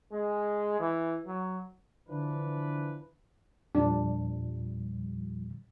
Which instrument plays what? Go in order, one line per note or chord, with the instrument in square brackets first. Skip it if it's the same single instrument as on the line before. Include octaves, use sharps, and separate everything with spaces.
[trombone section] G#3
E3
F#3
[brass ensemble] D3 E3 F3 D4 B4
[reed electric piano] E2 A#2 [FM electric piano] F3 G3 [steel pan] D4